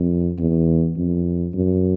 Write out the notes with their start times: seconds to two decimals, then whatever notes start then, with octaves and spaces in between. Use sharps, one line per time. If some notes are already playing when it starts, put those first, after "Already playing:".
Already playing: F2
0.38 E2
0.96 F2
1.54 F#2